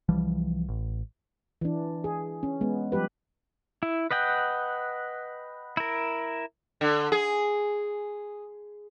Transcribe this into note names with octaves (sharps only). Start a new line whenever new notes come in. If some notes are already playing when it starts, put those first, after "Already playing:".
C2 E3 F3 G3
A1
E3 D4
G#4
C#4
G#3 B3
F3 G3 G4 B4
E4
B4 D#5 F#5 G5
E4 A#4
D3
G#4